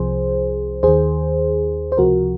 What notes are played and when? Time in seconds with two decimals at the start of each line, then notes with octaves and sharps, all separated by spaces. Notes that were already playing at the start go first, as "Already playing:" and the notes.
Already playing: C2 C3 F3 G#4 C5
0.83 D#2 D#3 G#4 C5
1.92 C5
1.97 C#2 C3 F3 F#4 A#4